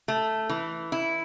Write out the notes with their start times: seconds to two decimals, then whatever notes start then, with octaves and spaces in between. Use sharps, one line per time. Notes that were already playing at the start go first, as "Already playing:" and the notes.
0.08 A3
0.49 E3
0.92 E4